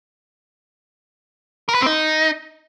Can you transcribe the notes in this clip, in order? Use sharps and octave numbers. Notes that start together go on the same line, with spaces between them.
A#4
B4
C4
D#4